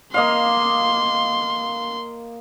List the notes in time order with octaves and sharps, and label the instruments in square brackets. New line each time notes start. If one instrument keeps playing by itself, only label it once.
[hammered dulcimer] A#3 D#5 F5 [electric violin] C6